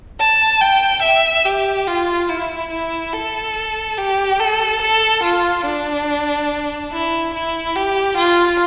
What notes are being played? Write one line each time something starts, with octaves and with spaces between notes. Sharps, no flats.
A5
G5
E5
G4
F4
E4
E4
A4
G4
A4
A4
F4
D4
E4
E4
G4
F4